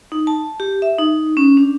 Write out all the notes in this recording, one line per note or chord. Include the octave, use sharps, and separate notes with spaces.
D#4
A5
G4
E5
D#4
C#4
D4